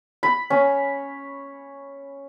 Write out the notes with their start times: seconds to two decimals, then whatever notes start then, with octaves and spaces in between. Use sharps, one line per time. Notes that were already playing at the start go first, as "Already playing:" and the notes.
0.23 B5
0.50 C#4